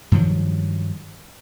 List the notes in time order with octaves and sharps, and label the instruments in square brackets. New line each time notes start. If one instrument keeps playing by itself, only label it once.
[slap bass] G2 D#3 F3 F#3